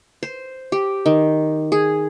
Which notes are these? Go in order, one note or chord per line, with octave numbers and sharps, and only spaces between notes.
C5
G4
D#3
G#4